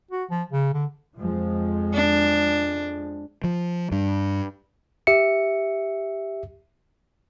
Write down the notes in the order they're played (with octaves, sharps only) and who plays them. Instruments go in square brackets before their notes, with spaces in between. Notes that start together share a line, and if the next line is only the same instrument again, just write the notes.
[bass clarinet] F#4
F3
C#3
D3
[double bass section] F2 F3 G#3
[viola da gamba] D4
[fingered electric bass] F3
G2
[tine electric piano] G4 E5 C#7